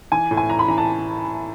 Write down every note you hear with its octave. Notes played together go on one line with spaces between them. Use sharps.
E3 G#5
A2
G#5
E3 A#5
B5
E3 A#5
A5